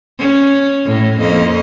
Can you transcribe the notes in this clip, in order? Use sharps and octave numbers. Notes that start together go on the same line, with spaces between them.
C#4
A2 A3
F2 A#3 D#5